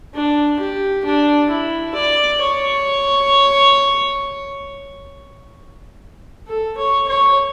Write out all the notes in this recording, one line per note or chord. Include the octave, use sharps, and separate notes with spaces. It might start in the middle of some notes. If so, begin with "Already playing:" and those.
D4
G4
D4
E4
D5
C#5
A4
C#5
C#5